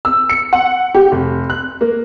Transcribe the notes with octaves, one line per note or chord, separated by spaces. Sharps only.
E6
C#7
F#5
G4
F1
F#6
A#3